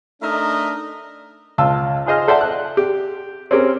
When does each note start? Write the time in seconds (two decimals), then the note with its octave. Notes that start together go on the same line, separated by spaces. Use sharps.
0.22 A3 D4 D#4 A#4 D#5 E5
1.58 C#2 F4 A5 E6
2.06 F4 G#4 C5 D#5 F6
2.28 A4 C5 D5 E5 F#5 A5
2.41 F#6
2.77 G4
3.51 C4 C#4 G4 A#4